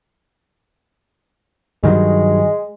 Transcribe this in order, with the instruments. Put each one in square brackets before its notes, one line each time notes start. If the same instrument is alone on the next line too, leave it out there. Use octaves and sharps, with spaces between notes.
[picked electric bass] G2 D#3 F#3 [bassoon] G#3